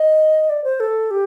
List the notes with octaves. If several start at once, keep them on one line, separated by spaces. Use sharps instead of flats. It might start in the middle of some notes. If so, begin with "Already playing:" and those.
Already playing: D#5
D5
C5
A4
G4